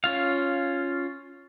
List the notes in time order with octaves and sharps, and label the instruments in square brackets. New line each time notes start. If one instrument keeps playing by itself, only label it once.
[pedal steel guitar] C#4 F4 F5